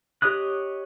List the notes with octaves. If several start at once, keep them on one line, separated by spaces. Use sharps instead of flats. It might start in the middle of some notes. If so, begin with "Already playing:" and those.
G4 C#5 D#5 D#6 F#6